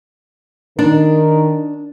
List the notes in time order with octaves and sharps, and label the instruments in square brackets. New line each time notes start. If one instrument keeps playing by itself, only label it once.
[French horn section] D#3 D#4 A#4 [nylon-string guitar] D4